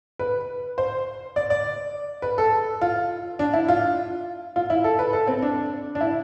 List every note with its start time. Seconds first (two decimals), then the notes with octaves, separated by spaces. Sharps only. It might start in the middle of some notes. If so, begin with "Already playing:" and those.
0.19 B4
0.78 C5
1.36 D5
1.50 D5
2.22 B4
2.38 A4
2.81 F4
3.39 D4
3.54 E4
3.68 F4
4.56 F4
4.70 E4
4.84 A4
4.99 B4
5.13 A4
5.27 C4
5.42 D4
5.95 D4
6.01 E4